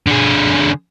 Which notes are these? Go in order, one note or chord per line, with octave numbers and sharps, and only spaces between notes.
D3 G#4